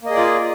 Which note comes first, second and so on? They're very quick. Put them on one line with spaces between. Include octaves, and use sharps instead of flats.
A#3 D#5 G#4 D5 F4